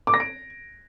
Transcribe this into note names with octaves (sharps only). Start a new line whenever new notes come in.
D6
A#6
D7